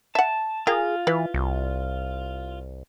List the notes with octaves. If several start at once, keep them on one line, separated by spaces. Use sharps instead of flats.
E5 F#5 A5
F4 G#4 A#4 G5
E3 E4 B4
C2